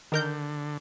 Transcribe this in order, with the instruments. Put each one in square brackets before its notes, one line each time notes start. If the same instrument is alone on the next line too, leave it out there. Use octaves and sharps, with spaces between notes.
[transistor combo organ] D3 [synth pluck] D#3 A#4 G6